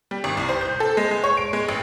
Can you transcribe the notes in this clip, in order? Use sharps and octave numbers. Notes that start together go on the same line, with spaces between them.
G3
G#1
C2
C5
G6
A4
G#3
G#3
C#5
D7
G#3
A1